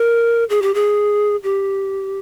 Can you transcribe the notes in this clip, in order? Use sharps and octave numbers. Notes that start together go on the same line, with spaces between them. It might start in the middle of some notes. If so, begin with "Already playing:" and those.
Already playing: A#4
G#4
G4
G#4
G4